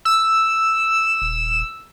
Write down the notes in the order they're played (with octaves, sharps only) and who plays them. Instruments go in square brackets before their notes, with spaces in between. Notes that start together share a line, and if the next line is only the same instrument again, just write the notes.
[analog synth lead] E6
[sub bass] D#1